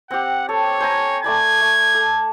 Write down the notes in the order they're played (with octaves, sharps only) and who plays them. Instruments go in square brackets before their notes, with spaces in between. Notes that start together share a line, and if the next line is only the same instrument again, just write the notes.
[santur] C4 G4 [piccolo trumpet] F#5
[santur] A4 [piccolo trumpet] C#5
[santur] C5 G#5 A#5
[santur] A3 D5 B5 [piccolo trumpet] G#6
[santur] A3
A4